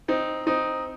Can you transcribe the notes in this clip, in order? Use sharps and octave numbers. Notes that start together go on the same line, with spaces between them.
C4 D#4
C4 D#4